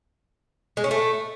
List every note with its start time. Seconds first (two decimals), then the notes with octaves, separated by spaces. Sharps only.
0.77 G#3
0.84 C#4
0.91 A3